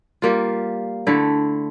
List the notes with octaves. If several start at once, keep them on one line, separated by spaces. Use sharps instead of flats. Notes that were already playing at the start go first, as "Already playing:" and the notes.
G3 A#3 F4
D3 A3 E4